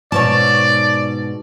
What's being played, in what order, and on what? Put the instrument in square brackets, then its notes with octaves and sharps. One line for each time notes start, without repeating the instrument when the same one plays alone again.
[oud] G#2 B2 C#5 [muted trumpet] D5 [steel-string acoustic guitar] A5